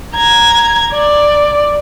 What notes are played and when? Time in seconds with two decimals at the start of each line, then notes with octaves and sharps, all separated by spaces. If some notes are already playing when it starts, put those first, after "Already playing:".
0.16 A#5 G#6
0.94 D5